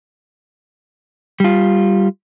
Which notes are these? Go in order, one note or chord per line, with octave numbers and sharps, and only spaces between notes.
G3 F4